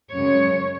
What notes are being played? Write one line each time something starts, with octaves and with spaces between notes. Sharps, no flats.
F#2 C#3 G#3 C#5